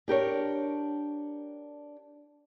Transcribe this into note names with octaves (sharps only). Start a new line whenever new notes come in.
D4 G4 A#4 C#5